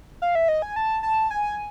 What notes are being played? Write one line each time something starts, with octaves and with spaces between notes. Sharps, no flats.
F5
E5
D#5
G#5
A5
A5
G#5